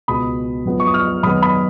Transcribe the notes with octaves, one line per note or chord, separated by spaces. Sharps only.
C#2 B2 G#3 B3 B5 D#6
F#2 F3 G#3 B3
C#6
D#6
C#6 F6
F#2 D#3 G#3 B3 B5 D#6
B5 D#6